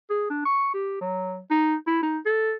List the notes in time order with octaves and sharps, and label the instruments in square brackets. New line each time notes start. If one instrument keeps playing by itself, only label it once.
[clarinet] G#4
D4
C#6
G4
F#3
D#4
E4
D#4
A4